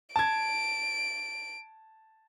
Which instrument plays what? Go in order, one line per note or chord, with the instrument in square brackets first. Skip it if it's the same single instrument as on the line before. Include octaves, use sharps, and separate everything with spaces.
[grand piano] A5 G#6 [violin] D7